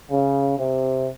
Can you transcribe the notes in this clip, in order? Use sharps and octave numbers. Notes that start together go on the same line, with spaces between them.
C#3
C3